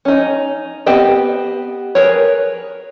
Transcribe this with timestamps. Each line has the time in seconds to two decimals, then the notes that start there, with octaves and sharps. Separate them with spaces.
0.05 C#4 D#4
0.86 B3 C4 G4 B4 D#5
1.95 G#4 A#4 B4 C#5